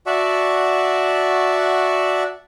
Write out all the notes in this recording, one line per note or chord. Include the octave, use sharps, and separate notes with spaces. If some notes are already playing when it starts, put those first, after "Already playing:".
F#4 D5 E5 F#5 A5 C#6